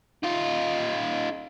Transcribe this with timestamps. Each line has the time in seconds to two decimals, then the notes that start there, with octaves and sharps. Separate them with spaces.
0.23 D#4 F4